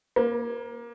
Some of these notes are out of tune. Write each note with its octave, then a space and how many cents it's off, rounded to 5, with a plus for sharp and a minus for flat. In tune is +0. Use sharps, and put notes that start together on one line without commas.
A#3 +20